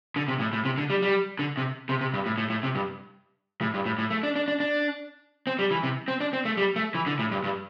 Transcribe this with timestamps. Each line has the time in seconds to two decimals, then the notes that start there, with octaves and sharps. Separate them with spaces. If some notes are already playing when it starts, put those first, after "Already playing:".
0.16 D3
0.28 C3
0.40 A2
0.53 A2
0.65 C3
0.78 D3
0.90 G3
1.02 G3
1.39 D3
1.57 C3
1.89 C3
2.01 C3
2.14 G2
2.26 A2
2.38 A2
2.50 A2
2.63 C3
2.75 G2
3.61 A2
3.74 G2
3.86 A2
3.98 A2
4.11 A3
4.23 D4
4.36 D4
4.48 D4
4.60 D4
5.47 C4
5.59 G3
5.71 E3
5.83 C3
6.08 C4
6.21 D4
6.33 C4
6.45 A3
6.57 G3
6.76 A3
6.95 E3
7.06 D3
7.19 A2
7.31 G2
7.44 G2